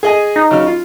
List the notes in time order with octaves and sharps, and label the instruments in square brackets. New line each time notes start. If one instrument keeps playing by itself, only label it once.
[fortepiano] G#4 D#5 G#5
[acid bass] D#4
[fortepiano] C#3 F#3 F6
F4